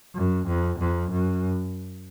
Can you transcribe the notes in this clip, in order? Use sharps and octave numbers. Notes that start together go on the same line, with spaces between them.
F#2
F2
F2
F#2